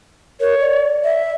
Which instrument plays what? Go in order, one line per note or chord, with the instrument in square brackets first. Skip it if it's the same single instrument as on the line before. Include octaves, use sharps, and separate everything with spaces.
[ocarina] A#4 [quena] C#5
[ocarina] D5
[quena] E5